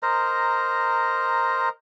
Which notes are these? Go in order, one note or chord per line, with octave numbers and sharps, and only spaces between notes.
A#4 C5 D#5 A#5